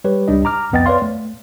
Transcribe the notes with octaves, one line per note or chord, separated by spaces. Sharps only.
G3 G4 B4 C#5
C#2 G3 D4 D#4 D#5
A#5 D6 F6
C2 F2 B3 D#5 G5 A6
B4 C#5 D5 F5 C6
A3